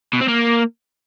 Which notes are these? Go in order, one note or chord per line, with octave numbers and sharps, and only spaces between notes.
B2
C4
A#3